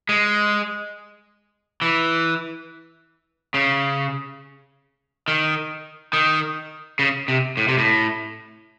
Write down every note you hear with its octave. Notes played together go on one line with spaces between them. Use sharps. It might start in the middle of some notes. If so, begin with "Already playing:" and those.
G#3
E3
C#3
D#3
D#3
C#3
C3
A2
C3
A2